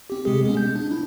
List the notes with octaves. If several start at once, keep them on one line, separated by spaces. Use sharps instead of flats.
C4 G4
C3 G#3 G#4
G#3 B3 C#4
G6
D4
E4